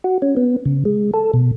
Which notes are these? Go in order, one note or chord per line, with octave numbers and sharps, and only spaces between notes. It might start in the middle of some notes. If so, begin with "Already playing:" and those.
F#4
C#4
B3
C#3
G#3
A4
B2